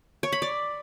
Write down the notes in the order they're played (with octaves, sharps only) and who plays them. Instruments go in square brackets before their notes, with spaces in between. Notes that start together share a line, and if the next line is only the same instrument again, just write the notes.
[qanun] C#5
B5
D5